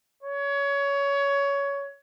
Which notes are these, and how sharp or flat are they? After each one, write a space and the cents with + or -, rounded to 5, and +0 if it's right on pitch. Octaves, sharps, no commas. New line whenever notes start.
C#5 +20